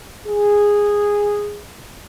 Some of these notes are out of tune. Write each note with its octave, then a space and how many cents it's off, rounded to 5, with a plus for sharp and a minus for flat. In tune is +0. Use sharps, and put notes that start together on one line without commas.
G#4 -10